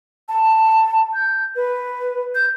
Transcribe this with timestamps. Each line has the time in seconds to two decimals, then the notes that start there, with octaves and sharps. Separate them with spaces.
0.28 A5
1.13 G6
1.56 B4
2.35 G6